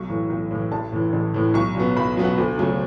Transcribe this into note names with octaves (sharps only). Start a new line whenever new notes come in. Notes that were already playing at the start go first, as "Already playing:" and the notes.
Already playing: B1 C#6
A2 E3
B1
A2 E3
A1 A5
A2 E3
A1
A2 E3
B1 C#6
B2 F#3 B3
B1 B5
B2 F#3 B3
F#5
D2
C#3 F#3 A3